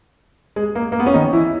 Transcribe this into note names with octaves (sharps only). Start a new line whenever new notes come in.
G#3
A#3
A#3
B3
C#4
D#3 D#4
E3 E4
E4